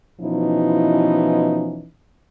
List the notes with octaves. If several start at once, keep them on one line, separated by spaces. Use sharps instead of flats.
B2 E3 F3 C#4 D#4 E4